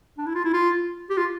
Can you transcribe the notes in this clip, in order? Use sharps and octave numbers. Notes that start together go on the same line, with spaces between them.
D4
E4
F4
E4
F4
G4
F4